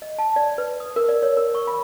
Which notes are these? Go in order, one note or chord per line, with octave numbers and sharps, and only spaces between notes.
D#5
A5
D5
B4
D#6
A#4
D5
C#5
A#4
C#6
B5